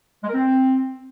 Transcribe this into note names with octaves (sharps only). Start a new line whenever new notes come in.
G#3
A#4
C4